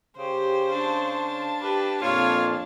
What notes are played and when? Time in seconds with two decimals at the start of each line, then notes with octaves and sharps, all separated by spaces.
0.18 C#3 G4 C5
0.69 D4 F5 A5
1.60 G4 B4
2.02 F2 A#2 A#3 F4 C#5 F5